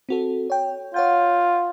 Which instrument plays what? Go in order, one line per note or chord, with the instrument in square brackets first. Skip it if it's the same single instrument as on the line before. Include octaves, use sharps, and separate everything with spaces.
[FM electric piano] C4 F#4 A4
C#5 G5
[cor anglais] F4 [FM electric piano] C#5 F#5 G6